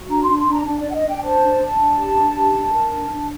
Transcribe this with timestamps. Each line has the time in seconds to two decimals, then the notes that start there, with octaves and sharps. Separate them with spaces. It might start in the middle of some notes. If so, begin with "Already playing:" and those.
Already playing: F#4
0.08 D4 A#5
0.23 D4 C6
0.37 C6
0.47 D4 A#5
0.66 D4 A5
0.80 D4 D5
0.90 F#5
0.94 D#5
1.04 D4 G5
1.22 C5 A5
1.41 D4
1.59 D4
1.78 D4
1.97 G4
2.16 D4
2.35 G4
2.54 D4
2.73 A#4
2.92 D4
3.11 D4